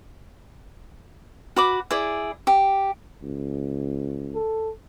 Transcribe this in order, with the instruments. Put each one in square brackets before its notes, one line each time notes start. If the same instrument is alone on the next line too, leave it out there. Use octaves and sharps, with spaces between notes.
[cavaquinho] F#4 B5 D6
E4 G#4 D5
G4
[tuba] C#2
[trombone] A4